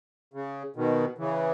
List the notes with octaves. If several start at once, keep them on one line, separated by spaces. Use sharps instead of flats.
C#3
B2 D#3
C#3 E3